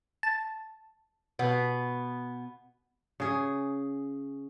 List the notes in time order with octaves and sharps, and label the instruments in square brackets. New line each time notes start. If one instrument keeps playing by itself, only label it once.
[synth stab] A5
[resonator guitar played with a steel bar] B2 B3
[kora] C#3 G#4